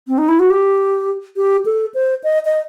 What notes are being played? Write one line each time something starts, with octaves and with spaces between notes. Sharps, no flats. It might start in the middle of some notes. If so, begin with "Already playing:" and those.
C4
D#4
E4
F#4
G4
G4
A4
C5
D#5
D#5